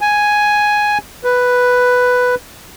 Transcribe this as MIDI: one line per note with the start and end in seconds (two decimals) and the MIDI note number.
0.01 0.98 80
1.24 2.35 71